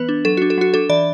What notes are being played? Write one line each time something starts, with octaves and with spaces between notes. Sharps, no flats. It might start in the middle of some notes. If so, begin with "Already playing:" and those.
Already playing: E3 B3 B4
D4
F#3 A4
F#4
D4
A4
F#3 F#4
D4 A4
E3 D5